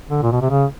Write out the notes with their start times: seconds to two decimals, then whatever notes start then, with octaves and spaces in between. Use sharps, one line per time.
0.10 D3
0.22 A#2
0.32 B2
0.42 C3
0.51 C#3